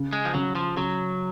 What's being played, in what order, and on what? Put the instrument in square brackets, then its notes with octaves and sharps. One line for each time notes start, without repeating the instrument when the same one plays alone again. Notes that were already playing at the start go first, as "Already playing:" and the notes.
Already playing: [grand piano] C#3
[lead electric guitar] G#3
F3
[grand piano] C#3 [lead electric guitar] F#3
[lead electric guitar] F3
[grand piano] C#3 [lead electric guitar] F#3